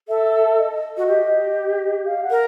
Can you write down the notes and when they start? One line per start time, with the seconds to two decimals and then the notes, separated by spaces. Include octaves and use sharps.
0.08 A4 E5
0.58 D#5
0.97 F#4
1.07 G4
2.06 F5
2.23 F#5
2.31 A#4